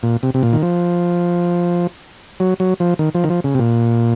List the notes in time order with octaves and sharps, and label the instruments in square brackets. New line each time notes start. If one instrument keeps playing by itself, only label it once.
[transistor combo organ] A#2
C3
C3
A#2
D#3
F3
F#3
F#3
F3
D#3
F3
D#3
F3
C#3
C3
A#2